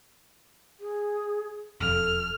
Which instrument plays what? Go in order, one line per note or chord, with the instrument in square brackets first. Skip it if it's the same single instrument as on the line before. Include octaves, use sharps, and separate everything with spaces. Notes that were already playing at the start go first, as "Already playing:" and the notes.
[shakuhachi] G#4
[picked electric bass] E1 F2 [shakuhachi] A4 [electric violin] F6